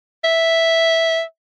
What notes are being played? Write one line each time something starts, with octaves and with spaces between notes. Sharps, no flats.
E5